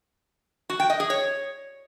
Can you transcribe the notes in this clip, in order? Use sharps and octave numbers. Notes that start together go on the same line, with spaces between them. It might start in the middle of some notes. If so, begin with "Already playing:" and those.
F#4
G5
D#5
G#4
C#5